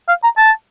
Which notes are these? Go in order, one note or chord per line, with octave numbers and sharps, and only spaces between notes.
F5
A#5
A5